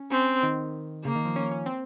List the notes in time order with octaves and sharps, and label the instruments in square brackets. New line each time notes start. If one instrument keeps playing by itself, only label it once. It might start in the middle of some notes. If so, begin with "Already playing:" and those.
Already playing: [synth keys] C#4
[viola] C4 [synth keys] C#4
[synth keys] D#3
[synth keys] C#3 [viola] A#3
[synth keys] D#3
F3
C#4
C#4
C4